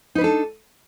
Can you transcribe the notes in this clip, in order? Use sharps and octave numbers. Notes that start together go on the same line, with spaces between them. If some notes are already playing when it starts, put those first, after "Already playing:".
D4 D#4 A4 B4